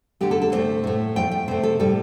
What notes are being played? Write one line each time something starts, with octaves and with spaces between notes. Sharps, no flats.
D3 A3 G4
A4
A4
C3 A3 C5
A2 A3
A2 F3 A3 G5
G5
C3 A3 C5
A4
A2 G3 A4